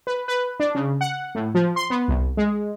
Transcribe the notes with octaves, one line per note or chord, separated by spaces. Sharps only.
B4
B4
D4
C#3
F#5
A2
F3
C6
B3
C2
G#3